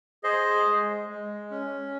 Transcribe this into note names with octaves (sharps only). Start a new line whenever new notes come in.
G#4 C5 D#5
G#3
G#3
C#4